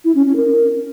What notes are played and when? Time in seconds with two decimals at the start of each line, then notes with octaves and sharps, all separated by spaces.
0.05 E4
0.15 C#4
0.26 C#4
0.36 A#4